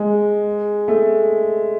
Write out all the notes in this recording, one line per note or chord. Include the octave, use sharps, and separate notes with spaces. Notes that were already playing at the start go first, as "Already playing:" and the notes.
Already playing: G#3
A3